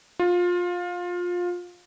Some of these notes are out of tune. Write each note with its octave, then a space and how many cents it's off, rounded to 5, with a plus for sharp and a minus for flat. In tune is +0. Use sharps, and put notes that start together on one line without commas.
F4 +20